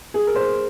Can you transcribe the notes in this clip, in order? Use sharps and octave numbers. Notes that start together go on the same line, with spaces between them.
G#4
A#4
C5